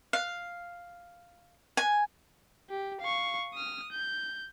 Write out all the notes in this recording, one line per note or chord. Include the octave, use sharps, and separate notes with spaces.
F5
G#5
G4
F5 C#6
D#6 F6
G6